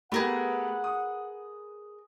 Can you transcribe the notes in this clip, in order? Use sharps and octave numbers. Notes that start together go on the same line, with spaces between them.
A3 B3 G4 G#4 A#4 B4 F#5
D#6